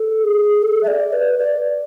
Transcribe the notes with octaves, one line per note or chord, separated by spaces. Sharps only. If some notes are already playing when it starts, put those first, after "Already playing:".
Already playing: A4
G#4
A4
E5
D5
B4
D5